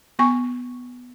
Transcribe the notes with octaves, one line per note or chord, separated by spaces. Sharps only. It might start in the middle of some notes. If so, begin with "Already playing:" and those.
B3 G#5 C#6